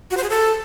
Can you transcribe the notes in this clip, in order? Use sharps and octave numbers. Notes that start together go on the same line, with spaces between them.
F#4
C5
G#4
A4